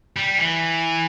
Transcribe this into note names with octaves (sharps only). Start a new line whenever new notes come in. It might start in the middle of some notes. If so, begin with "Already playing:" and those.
G3
E3